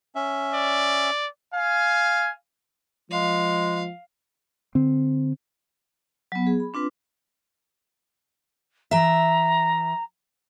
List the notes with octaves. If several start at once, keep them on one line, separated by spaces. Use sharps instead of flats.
C#4 E5
D5
F5 G#5
F3 G#3 F5
D3 C4
F#3 B3
G#4
B5
C4 D4 F4 B4
E3 E5 A#5